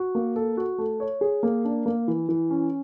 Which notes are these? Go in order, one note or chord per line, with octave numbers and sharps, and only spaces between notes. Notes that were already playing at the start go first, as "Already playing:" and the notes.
Already playing: F#4
A#3
A4
F#4
A3
C#5
G#4
A#3
D4
A#3
E3
E3
C#4